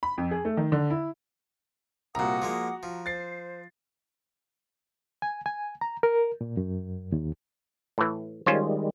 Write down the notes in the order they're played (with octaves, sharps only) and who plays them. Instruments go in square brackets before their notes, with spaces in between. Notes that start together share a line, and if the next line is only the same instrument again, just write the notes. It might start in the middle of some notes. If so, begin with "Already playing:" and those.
[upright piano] B5
F2
G#4
A3
D#3
D3
E4
[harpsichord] C2 A#2 [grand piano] F#4 A#5 [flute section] F#5 D6 D#6
[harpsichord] F3 G#3 A#3
F3
[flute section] C5 [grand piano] A6 C7
[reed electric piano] G#5
G#5
A#5
A#4
A#2
F#2
D#2
[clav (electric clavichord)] A2 E3
[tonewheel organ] D#3 G3 G#3 [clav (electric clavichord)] C#4 F4 C5